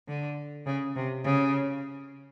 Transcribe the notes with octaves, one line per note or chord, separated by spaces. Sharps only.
D3
C#3
C3
C#3